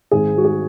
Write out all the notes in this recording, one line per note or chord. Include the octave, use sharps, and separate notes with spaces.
G#1 G#4
G#3 F#4
G#4